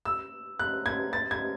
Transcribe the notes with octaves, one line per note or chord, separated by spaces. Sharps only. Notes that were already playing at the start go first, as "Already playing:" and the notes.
E6
F#6
G#6
A6
G#6